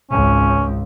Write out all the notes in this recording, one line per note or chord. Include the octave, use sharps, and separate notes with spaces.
G#1 C#2 C#4